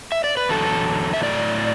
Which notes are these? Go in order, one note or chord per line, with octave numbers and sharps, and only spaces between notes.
E5
D5
B4
E2 D3 F#3 A4
E5
A2 F#3 D5